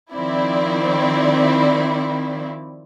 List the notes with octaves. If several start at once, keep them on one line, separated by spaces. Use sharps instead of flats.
D#3 F3 C4 E4 D5